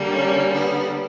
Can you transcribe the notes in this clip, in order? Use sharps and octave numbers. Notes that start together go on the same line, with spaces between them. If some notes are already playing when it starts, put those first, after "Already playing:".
Already playing: D3 G3 A#3
C#4
B3